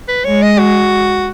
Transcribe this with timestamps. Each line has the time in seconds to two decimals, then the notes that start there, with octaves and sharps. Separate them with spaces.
0.08 B4
0.25 G#3 C#5
0.42 D#5
0.59 F#4